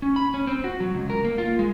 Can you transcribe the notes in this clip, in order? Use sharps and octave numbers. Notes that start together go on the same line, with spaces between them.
C#4
B5
C#4
C4
F#4
F#3
C#2
A#4
A#3
F4
G#3